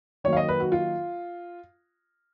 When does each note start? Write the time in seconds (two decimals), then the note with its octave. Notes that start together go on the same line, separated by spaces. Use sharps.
0.24 D#3 F#3 A#3 C#5
0.33 F5
0.37 D#5
0.49 B4
0.60 F#4
0.72 F4